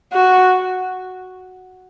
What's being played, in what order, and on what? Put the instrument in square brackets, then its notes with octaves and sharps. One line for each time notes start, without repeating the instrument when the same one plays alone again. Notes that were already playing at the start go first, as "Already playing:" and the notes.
[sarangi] F#4